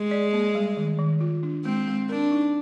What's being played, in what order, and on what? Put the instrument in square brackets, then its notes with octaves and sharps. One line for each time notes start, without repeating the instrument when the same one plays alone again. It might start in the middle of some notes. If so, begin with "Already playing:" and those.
Already playing: [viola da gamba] G#3
[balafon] D5
A#3
G3
D#3
D#3
F4
D4
[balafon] G#3 [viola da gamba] C4
[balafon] G#3
[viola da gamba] D4 [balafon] A#4
[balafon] D#4